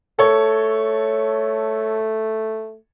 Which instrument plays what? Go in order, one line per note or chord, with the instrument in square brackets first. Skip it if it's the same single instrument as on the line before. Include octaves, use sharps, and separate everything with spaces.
[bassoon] A3 [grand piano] A4 C#5